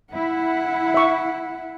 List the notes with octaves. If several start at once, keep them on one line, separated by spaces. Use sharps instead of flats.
E4 F#5
E5 C#6